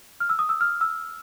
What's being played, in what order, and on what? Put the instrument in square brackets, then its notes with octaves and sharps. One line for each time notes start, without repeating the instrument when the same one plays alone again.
[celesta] F6
E6
D#6
E6
F6
E6